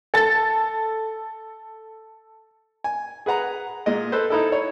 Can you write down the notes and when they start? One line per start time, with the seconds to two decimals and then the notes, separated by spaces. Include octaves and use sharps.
0.14 A4 A6
2.84 G#5
3.26 G#4 B4 F#5 A#5
3.86 A#2 G#3 D#5
4.12 A4 B4 C5
4.30 D#4 E4 A4
4.52 C#5